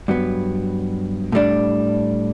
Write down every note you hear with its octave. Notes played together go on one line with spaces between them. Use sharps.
G2 F#3 B3
A2 G3 D4